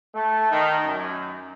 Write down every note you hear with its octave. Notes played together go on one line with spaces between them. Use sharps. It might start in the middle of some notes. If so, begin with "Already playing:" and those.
A3
D#3
F#2